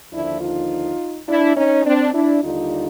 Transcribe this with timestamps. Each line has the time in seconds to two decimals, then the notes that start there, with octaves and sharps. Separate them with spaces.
0.12 D#2 D3 F3 D4 E4
0.41 D#4 F4
1.28 D4 E4
1.56 C#4 D#4
1.85 C4 D4
2.14 D4 E4
2.43 D#2 D3 G3 D#4 F4